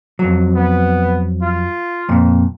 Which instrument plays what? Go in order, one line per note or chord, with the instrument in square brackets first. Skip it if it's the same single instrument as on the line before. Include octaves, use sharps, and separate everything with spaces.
[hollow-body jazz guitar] F2 F#3
[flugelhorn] B3
F4
[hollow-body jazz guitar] F2 A#2